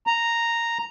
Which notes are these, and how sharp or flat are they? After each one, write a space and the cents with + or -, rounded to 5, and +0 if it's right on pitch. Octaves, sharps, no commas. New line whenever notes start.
A#5 -5